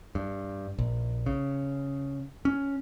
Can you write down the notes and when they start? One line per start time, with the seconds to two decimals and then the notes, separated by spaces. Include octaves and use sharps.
0.15 G2
0.79 A#1
1.26 C#3
2.45 C#4